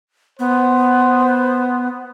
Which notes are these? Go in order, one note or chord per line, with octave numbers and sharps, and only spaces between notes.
B3 C5